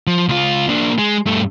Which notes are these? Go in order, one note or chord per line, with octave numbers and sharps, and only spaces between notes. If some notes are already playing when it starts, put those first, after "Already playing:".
F3
C#2 F4
A#3 D4
G#3
G2 A3